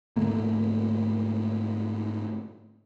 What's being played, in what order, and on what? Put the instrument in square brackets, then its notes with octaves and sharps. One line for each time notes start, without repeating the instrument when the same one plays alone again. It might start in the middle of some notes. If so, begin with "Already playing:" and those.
[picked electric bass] G#2 D3 A3 A#3